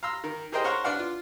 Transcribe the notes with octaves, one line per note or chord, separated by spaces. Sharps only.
F5 A#5 C6 E6
D#3 A#4
G4 G#4 A#4 C5 D#5 G5
C5 C#5 F5 F#5 A#5 C#6
D4 B4 D5 F5 F#5
F4